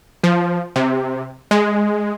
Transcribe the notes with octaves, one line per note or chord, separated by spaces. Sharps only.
F3
C3
G#3